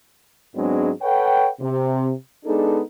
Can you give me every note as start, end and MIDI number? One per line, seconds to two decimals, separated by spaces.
0.56 0.90 44
0.56 0.90 54
0.56 0.90 56
0.56 0.90 59
0.56 0.90 60
0.56 0.90 62
1.02 1.48 69
1.02 1.48 71
1.02 1.48 73
1.02 1.48 78
1.02 1.48 79
1.61 2.12 48
2.46 2.81 56
2.46 2.81 59
2.46 2.81 62
2.46 2.81 63
2.46 2.81 68
2.46 2.81 69